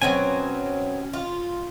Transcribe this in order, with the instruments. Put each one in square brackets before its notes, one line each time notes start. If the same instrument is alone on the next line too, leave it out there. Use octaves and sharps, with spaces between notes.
[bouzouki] B2 F#3 C4 [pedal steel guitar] C#4 G#5
[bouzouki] F4